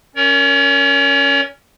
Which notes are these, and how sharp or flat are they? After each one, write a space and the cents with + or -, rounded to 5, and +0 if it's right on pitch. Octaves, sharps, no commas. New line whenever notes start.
C#4 +0 A#4 +0 C#5 +40